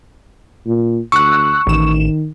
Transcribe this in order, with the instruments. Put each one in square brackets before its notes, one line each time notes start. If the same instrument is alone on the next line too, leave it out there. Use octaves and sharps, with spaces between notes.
[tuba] A#2
[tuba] D2 [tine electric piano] C#6 [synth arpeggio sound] E6 F#6
[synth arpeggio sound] A1 E7 [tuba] D#3